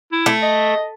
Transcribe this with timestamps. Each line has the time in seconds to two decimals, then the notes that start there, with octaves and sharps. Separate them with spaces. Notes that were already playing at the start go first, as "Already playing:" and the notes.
0.12 E4
0.26 A3
0.42 D#5